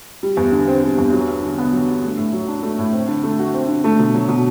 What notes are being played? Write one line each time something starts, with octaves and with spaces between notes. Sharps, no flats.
G3
E2
D3
C4
G3
E2
F#3
G2
D3
B3
F#3
G2
A3
A2
F#3
D4
A3
A2
C4
D3
A3
F#4
C4
D3
A3
B2
F#3
B2